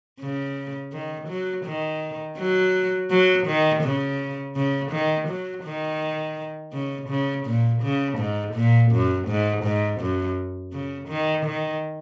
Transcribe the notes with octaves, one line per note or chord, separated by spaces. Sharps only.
C#3
D#3
F#3
D#3
F#3
F#3
D#3
C#3
C#3
D#3
F#3
D#3
C#3
C#3
A#2
C#3
G#2
A#2
F#2
G#2
G#2
F#2
C#3
D#3
D#3